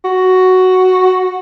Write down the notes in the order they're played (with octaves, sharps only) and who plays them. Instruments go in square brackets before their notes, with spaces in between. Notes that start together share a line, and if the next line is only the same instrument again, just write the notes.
[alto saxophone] F#4